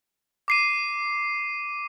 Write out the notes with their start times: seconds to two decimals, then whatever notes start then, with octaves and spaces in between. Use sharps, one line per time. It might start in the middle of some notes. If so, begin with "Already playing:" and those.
0.48 D6 C7 D#7